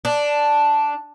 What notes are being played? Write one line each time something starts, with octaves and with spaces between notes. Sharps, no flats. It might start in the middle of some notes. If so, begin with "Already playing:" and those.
D4